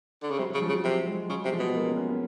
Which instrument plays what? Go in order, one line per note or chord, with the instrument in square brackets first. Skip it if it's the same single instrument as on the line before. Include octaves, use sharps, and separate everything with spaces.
[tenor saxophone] D3
C#3
[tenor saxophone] C3 [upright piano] F#3
[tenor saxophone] C#3 [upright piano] F#3
[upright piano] F3 G3
[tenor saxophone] C#3
[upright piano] F#3
[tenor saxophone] C3
[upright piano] F#3 G#3
[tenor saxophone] C#3 [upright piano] F#3 G#3
[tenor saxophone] C3 [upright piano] G#3
[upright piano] F3 G3
[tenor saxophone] B2
[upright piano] G#3 A#3
B3 C#4
B3 C#4
B3 C#4